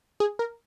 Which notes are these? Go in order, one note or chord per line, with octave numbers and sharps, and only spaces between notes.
G#4
A#4